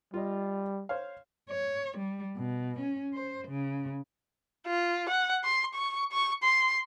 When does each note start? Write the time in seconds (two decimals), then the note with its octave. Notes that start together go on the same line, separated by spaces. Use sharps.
0.14 G3 F4 D#5
0.89 C5 C#5 F5
1.50 C#5
1.98 G3
2.37 B2
2.79 C#4
3.13 C5
3.48 C#3
4.67 F4
5.09 F#5
5.44 C6
5.74 C#6
6.12 C#6
6.43 C6